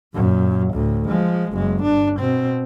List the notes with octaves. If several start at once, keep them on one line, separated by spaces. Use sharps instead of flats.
F#2 A#2
D2 A2
F3 G#3
F#1 G#3
G1 D4
B2 C4